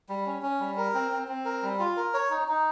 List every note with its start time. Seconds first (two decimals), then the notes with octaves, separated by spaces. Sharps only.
0.09 G3
0.26 C#4
0.43 C#4
0.60 G3
0.77 A#4
0.94 C4
1.12 C4
1.28 C4
1.45 A#4
1.62 G3
1.80 F4
1.97 A#4
2.14 C#5
2.30 D#4
2.48 D#4